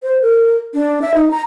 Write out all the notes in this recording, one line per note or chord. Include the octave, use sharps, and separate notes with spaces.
C5
A#4
D4
E5
D#4
A#5